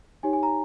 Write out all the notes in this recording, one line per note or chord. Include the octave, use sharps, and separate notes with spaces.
D#4 G4 C#5 G#5
G#5
A#5